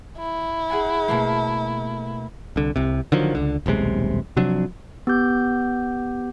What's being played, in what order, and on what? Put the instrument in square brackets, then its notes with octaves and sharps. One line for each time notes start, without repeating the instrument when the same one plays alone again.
[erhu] E4
[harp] G#4 F#5 G#5
B2 A3 A#3
[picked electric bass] C2 D3
C2 C3
D3 D#3 F3 F#3
C#2 D3
D#1 B1 C3 G#3
C3 F3 F#3 D4
[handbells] B3 G4 D6 G6